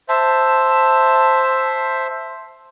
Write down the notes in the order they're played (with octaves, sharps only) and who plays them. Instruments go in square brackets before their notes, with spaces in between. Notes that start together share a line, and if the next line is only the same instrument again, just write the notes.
[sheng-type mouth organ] C5 E5 [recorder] A5